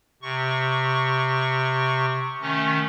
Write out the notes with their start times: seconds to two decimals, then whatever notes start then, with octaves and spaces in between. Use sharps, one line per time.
0.22 C3 C#6
2.41 D#3 A3 C#4